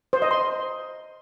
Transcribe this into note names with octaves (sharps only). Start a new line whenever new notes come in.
C5
D#5
C6